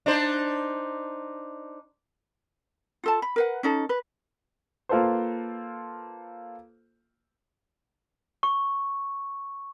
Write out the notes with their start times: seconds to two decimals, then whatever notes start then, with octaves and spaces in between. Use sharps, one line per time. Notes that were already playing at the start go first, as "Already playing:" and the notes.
0.06 D4 D#4 C5
3.04 F4 A4 A5
3.22 B5
3.36 A#4 B4 F#5
3.63 C#4 D#4 A4
3.89 B4
4.89 A#3 F4 A4 B4 C5
8.43 C#6